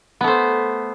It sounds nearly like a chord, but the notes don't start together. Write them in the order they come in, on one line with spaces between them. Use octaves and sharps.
B3 A3 C5